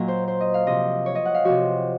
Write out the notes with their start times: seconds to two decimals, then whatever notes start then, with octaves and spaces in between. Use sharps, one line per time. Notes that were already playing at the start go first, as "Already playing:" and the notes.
Already playing: A#2 F#3 A#4 D#5
0.08 C5
0.28 C5
0.40 D#5
0.54 F5
0.66 C3 F3 D#5
1.06 C#5
1.15 D#5
1.25 F#5
1.34 F5
1.44 C3 F3 F#4